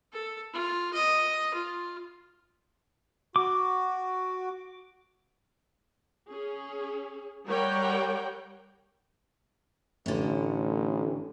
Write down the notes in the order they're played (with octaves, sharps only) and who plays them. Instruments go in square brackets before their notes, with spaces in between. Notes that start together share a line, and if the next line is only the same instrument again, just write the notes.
[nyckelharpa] A4
F4
D#5
F4
[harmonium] F#4 [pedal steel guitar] D6
[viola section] C#4 G#4
G3 A#4 C#5 F#5 G5
[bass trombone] A1 [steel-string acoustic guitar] A2 D3